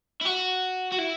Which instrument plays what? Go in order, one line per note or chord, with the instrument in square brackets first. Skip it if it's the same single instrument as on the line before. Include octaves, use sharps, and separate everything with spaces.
[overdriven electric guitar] E4
F#4
F#4
E4